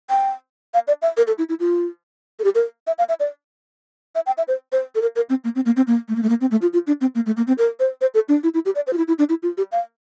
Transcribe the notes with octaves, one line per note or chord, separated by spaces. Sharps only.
G5
F5
D5
E5
A#4
A4
E4
E4
F4
A4
G4
A#4
E5
F5
E5
D5
E5
G5
E5
C5
C5
A4
A#4
A#4
C4
A#3
C4
A#3
C4
A#3
A3
A#3
A3
A#3
C4
A3
F4
F4
D4
C4
A#3
A3
A#3
C4
A#4
C5
C5
A4
D4
E4
E4
G4
D5
C5
F4
E4
E4
D4
E4
F4
G4
F5